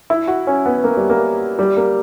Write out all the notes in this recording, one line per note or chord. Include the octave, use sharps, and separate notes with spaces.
E4
F#4
C#4
B3
A#3
G3
A#3
G3
A#3